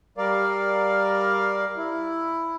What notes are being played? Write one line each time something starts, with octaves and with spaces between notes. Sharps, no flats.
G3 A#4 D5 F5
E4